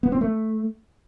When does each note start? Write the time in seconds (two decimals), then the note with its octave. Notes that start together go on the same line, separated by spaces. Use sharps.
0.03 B3
0.12 C4
0.21 A3